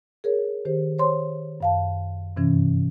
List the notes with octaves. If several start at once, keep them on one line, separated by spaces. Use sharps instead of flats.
G#4 A#4 C#5
D#3 G4 C5
C5 C#5 C6
F#2 F5 A5
G2 C3 E3 C#4